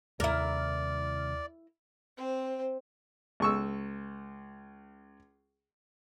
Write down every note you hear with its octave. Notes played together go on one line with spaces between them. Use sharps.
D#2 C3 D#3 G3 E4 A#4 D5 F6
C4 C5
C#2 C#6 E6